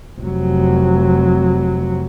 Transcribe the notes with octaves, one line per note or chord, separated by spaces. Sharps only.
F1 F#3